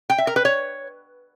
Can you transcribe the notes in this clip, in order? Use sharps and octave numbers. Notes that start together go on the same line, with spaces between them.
G5
E5
A#4
B4
C#5